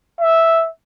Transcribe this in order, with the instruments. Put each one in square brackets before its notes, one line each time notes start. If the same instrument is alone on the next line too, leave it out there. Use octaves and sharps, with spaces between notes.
[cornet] E5